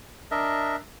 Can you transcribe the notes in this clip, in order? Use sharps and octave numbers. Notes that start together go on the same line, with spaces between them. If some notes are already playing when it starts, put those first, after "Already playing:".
D4 A#4 D#5 E5